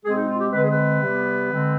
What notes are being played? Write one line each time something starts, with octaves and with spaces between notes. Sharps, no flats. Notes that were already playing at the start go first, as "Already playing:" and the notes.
B2 G#3 C4 G#4
D#4
F4
G4
D3 G#3 C4 B4
G#4
B4
C3 G3 B3
D3 G#3 C4